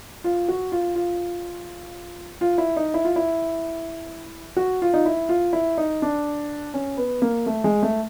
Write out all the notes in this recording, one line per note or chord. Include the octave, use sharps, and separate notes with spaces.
F4
F#4
F4
F4
F4
E4
D#4
E4
F4
E4
F#4
F4
D#4
E4
F4
E4
D#4
D4
C#4
B3
A#3
A3
G#3
A3